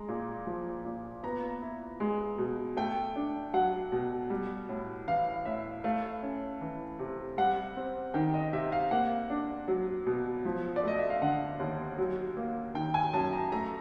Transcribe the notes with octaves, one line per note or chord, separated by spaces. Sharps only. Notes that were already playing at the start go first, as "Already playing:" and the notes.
Already playing: G#3 A#5
A#2
F3
A#2
B3 A#5
E4
G#3
B2
A3 G5
D4
F#3 F#5
B2
G3
A2
E3 F5
A2 E5
A3 F5
C#4
E3
C3
G3 F#5
C4
D#3 G5
D#5
C3 E5
F5
A#3 F#5
D4
F#3
B2
F3
D5
A3 D#5
E5
F5
D3 F#5
D#2
F#3
A#3
D#3 G5
G#5
F#2 A5
A#5
A3 A#5